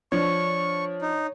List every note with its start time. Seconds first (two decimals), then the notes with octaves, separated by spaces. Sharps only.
0.12 F3 D4 C#5 C#6
1.02 D#4